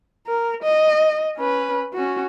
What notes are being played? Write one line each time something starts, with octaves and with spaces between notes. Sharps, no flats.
A#4
D#5
C#4 B4
C#4 F#4